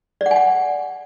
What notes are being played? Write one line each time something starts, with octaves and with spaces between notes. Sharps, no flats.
D5
F#5
G#5
F#5